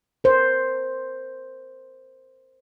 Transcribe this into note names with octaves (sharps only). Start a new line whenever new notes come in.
A#4 C5